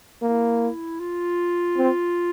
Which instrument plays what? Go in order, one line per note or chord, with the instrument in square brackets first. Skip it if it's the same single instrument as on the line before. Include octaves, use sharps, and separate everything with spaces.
[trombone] A#3 [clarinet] E4
[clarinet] F4
[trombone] C4